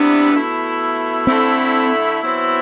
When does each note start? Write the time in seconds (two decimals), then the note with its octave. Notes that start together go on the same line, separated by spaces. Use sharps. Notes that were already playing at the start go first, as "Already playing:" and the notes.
Already playing: C3 E3 G3 B3 D4 E4
0.32 B2 A3 E4
1.27 D3 A3 C4 E4
2.22 B2 F#3 C4 E4